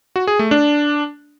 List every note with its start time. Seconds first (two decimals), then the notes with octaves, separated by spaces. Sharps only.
0.16 F#4
0.27 G#4
0.39 A3
0.51 D4